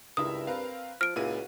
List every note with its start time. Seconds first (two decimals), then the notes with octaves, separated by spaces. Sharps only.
0.17 C#2 G2 E4 A#4 E5 D#6
0.47 C4 A#4 B4 F5
1.01 F3 F6 D7
1.16 C#2 A#2 E4 F#4 F5 D#7